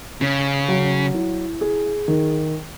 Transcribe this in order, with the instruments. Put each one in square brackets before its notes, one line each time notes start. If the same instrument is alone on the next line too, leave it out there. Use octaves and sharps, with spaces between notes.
[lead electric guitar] C#3 [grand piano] C#4
[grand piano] F#3
E4
G#4
D#3